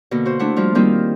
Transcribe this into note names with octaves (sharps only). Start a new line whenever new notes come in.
B2 D3 A#3
F#4 C5
A3 D4 E4 F#5
F3 G3 F4
D#3 G3 A#3 C4 D#4 F4